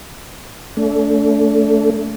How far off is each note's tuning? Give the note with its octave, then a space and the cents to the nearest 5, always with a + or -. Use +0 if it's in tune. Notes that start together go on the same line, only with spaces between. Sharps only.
A3 +0 D4 -40